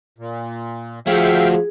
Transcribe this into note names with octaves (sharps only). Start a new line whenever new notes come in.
A#2
F3 A3 F#4 G#4 E5 F5 G5